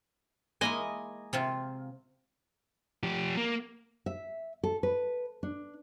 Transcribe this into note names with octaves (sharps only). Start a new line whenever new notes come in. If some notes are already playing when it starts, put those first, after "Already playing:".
G#3 A#3 E4 D#5 G#5
C3 C4 F4
F3 G4
A#3
E5
A4
B4
D4